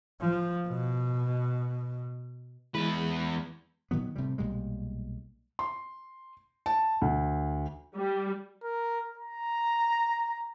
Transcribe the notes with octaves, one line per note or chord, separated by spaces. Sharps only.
F3
B2
E2 E3 G#3 E4 B4
A#2 D#3 F#3 B3
A2 C3 E3 G3
B1 A#2 G3 G#3
C6
A5
D2
G3
A#4
A#5